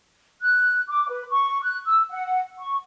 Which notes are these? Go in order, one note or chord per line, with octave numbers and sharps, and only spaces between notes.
F#6
D6
B4
C#6
F#6
E6
F#5
C#6